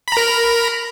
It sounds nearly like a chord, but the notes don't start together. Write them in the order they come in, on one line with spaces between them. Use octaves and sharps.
B5 A#5 A#4